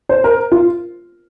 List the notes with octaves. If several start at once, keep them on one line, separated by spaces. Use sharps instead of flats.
C5
A#4
F4